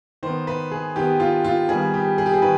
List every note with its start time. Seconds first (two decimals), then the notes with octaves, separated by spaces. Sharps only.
0.23 D#3 B3 C5
0.47 B4
0.71 G#4
0.96 D#3 B3 G4
1.20 F4
1.44 F4
1.69 D#3 G3 B3 G#4
1.94 G4
2.18 G#4
2.26 G4
2.34 G#4
2.42 D#3 B4